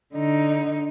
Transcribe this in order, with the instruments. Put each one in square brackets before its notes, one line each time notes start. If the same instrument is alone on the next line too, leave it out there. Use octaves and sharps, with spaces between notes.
[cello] D3 D#4